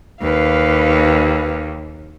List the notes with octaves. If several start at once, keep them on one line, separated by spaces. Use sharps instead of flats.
D#2 B4 F5